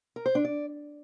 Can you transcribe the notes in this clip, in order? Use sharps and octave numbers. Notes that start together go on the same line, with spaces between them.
A#4
C5
D4
D5